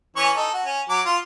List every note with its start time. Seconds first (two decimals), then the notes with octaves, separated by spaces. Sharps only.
0.16 E3 C#4 C#6
0.36 D#4 A4
0.53 F#4
0.66 C#4
0.89 F#3 D6
1.05 F4